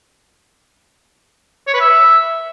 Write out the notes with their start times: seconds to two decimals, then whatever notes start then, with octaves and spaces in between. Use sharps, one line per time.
1.67 C#5
1.74 B4
1.80 E5